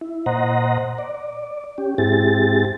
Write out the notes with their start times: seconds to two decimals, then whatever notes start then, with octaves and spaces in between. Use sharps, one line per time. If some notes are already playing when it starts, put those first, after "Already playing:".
0.01 E4
0.26 A#2 C5 D#5 F#5 A#5
0.98 D5
1.78 C#4 G4
1.98 G#2 C4 E4 G4 G#4 A6